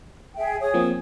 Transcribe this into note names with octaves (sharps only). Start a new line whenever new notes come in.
G#4 E5 G5
G#4 C#5 D#6
F3 A#3 C4